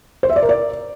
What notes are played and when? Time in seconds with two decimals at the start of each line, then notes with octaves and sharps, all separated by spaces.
0.23 C5
0.30 E5
0.36 D5
0.43 A#4
0.49 D5